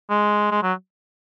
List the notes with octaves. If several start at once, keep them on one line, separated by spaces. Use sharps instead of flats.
G#3
G#3
F#3